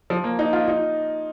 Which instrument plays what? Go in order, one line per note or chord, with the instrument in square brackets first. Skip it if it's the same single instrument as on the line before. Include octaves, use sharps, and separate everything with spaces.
[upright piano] F3
A#3
D#4
F4
D#4